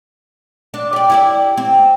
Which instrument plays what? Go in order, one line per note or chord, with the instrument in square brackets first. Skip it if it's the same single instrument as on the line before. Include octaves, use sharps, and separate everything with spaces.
[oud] D4
G4 D5
E4 G4 D5
C4